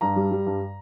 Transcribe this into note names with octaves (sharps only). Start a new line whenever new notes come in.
G2 A#5
G3
G3
G2